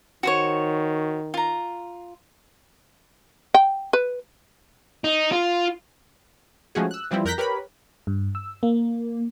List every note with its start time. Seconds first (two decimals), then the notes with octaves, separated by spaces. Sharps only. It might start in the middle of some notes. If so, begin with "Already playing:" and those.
0.23 D#3 F#4 C5 C#5
1.34 F4 A#5
3.54 G5
3.93 B4
5.04 D#4
5.32 F4
6.75 F3 G#3 A3 C#4 F#4 G#4
6.91 E6 F#6
7.11 E3 F3 G3 C4 E4
7.25 F2 A#4 F#6 G6 A#6 B6
7.38 G4 A#4 B4 C#5 B5
8.07 G2
8.35 E6
8.63 A#3